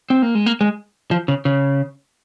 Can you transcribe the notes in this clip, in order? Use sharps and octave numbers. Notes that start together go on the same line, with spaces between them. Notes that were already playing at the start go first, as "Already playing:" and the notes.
C4
A#3
G#3
A#3
G#3
F3
C#3
C#3